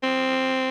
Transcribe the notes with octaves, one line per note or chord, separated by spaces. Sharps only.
C4